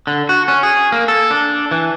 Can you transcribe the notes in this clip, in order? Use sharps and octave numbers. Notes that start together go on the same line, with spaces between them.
D3
F#4
C#4
G#4
A#3
A4
D4
E3